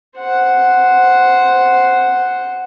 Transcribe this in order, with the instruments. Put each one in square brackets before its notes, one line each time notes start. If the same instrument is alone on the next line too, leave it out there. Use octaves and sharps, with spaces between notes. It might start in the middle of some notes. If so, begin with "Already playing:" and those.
[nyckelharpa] C5 F#5